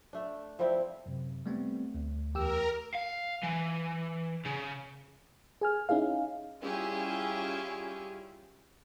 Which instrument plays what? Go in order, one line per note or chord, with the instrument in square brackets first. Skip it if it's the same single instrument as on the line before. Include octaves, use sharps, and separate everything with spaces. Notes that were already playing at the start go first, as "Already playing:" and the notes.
[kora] A3 D4
F3 G3 C4 E4
[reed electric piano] F#2 C3
[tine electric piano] G3 B3 C4 [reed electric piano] A3
[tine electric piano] D2
[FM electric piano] E2 G4 E6 [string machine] A#4
[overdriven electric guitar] F5
E3
C#3
[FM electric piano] G#4 G#5 F6
C#4 D#4 E4 G#4 F5
[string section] G3 C#4 E4 F4 G4 G#4